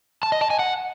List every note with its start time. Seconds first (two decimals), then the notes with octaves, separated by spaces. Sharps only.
0.23 A5
0.32 D#5
0.41 A5
0.50 G#5
0.59 F#5